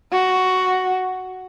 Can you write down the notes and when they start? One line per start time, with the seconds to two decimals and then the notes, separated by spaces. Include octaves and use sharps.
0.12 F#4